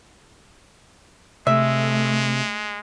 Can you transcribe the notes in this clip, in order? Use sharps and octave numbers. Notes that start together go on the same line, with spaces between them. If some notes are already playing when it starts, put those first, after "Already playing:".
C3 G#3 A3 E5